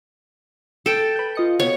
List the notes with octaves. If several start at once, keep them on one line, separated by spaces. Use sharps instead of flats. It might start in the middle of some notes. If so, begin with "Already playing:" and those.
A4 G5
B4 G6
F4 D#5 C#7
B2 C#5